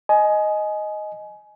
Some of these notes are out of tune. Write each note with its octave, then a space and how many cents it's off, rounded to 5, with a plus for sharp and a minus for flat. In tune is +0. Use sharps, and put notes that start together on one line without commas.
D#5 +0 G#5 +25